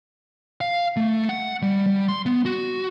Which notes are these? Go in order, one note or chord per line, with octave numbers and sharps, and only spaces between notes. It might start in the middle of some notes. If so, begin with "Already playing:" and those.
F5
A3
F#5
G3
G3
C6
B3
F#4